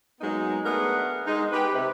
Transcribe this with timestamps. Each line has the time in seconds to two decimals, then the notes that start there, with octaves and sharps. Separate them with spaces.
0.21 F#3 G#3 A#3 B3 D#4
0.64 A3 B3 D4 G#4 A#4 F#5
1.26 G#3 D#4
1.52 G4 B4
1.73 C3